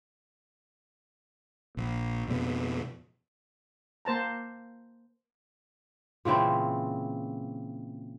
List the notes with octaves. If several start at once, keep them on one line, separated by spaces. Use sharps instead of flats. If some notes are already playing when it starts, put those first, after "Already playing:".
A#1
F2 B2
A#3 C5 A5 A#5
A#2 C#3 E3 C4